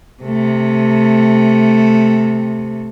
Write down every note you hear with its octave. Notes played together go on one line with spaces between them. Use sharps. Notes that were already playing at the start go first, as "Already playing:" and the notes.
C3 A3